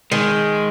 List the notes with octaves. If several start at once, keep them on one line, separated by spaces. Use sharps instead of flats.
D#3 G#3